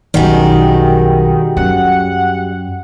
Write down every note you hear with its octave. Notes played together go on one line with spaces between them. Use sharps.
B1 F#2 D#3 G3 F#4 G#4
F#2 F#5